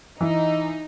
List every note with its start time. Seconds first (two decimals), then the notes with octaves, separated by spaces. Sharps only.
0.21 E3 D#4